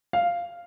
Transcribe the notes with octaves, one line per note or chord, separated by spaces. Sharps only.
F5